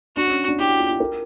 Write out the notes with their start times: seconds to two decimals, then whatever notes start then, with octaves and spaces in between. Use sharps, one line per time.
0.16 D4 F#4
0.27 C#4
0.48 D4
0.58 E4 G4
0.68 F#4
0.79 F4
0.89 E4
1.00 A#4